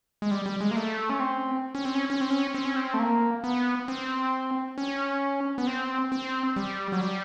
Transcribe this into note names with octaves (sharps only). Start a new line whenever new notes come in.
G#3
G3
G3
G#3
A#3
A3
C#4
C4
C#4
C4
C#4
C#4
C4
C#4
C4
C#4
C4
A3
A#3
B3
C4
C#4
B3
C4
C4
G3
F#3
G3